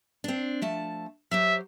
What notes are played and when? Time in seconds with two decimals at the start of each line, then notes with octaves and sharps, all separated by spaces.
0.24 C4 D4
0.62 F3 A3 A5
1.31 F#3 G4 C5 E5